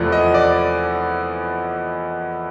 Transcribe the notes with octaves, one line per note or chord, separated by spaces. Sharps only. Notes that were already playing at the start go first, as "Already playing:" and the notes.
Already playing: E2 C3 F3 A3 D5
D#5
D5